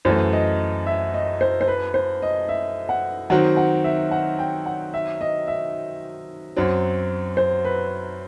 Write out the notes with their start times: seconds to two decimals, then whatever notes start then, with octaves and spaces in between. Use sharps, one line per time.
0.05 F#2 E3 A3 C5
0.32 D#5
0.86 E5
1.14 D#5
1.41 C5
1.61 C5
1.68 B4
1.94 C5
2.22 D#5
2.49 E5
2.89 F#5
3.30 D#3 F#3 C4 F#4 F#5
3.57 F#5
3.84 E5
4.11 F#5
4.39 G5
4.66 F#5
4.94 E5
5.21 D#5
5.48 E5
6.56 F#2 F#3 C4
7.37 C5
7.65 B4